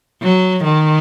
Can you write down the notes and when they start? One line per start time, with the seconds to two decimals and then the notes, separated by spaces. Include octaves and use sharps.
0.23 F#3
0.65 D#3